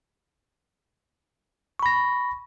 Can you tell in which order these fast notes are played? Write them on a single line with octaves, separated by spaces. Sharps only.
C#6 B5 A#6